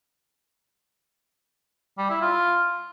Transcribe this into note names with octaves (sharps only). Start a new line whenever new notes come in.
G3
E4
F4